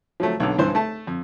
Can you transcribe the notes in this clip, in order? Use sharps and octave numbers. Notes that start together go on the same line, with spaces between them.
F3 F#3 A3
B1 D3
B1 G2 E3 C5
A3 A5
F2